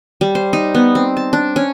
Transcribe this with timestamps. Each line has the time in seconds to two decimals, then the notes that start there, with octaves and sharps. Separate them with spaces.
0.21 G3
0.35 C5
0.53 D#4
0.75 B3
0.95 C4
1.17 A5
1.33 D4
1.56 C#4